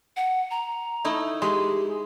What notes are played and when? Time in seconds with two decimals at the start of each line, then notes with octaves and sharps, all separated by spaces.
0.17 F#5
0.51 A#5
1.05 A3 D#4 E4
1.42 G#3 G4